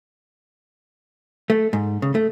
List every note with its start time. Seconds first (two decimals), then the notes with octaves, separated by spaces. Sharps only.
1.50 A3
1.73 G#2
2.02 C#3
2.15 A3